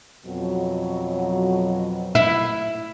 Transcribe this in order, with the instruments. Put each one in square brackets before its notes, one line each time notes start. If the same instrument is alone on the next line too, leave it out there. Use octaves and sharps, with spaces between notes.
[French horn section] F2 B2 F#3
[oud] E4